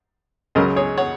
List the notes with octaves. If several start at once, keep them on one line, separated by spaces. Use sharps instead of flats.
C#2 C#3 F#3 A#4 D#5
G#4 C#5
C#5 F#5